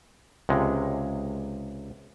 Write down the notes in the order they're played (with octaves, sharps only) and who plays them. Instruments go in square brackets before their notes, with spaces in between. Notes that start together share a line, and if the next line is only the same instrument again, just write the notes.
[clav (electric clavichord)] C#2 C3 G#3